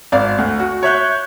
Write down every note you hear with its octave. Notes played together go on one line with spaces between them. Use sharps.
G#1 D5 F5
D2
F#4
C#5 E5 F#6 G6